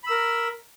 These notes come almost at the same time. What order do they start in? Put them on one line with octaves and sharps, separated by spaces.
B5 E6 A#4